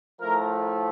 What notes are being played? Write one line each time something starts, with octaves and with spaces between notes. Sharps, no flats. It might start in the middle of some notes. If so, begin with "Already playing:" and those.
A2 F3 A3 A#4